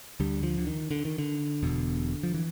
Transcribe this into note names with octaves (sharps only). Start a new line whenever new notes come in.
D2 D3 G3
F3
D3
D#3
D3
D#3
D3
E1 E2 B2
F3
E3